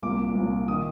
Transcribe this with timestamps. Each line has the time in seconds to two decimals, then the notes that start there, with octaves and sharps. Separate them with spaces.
0.02 C2 A#2 D6
0.35 C2 A#2
0.68 D#3 D#6